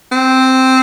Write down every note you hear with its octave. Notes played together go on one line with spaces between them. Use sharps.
C4